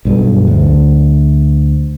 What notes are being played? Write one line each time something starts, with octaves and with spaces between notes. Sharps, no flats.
B1 G2
D2